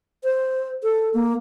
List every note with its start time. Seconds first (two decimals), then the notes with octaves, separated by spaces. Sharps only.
0.24 C5
0.83 A4
1.14 A#3